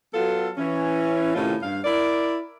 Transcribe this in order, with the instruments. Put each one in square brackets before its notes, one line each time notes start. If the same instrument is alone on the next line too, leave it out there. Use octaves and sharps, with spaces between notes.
[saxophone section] F#3 B3 F4 A4
E3 C#4
A2 C3 D#3 C#4 F4
G2 F5
E4 A#4 D5